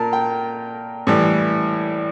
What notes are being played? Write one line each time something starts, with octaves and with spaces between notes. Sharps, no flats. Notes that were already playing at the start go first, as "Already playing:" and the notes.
Already playing: A#2 A#4 A5
G5
A2 E3 G3